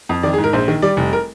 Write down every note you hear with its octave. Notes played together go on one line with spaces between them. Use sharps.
F2
D#3 D5
G#4
G#2
A#4
A#1 C5
D#3
G3 D5
F1
A#4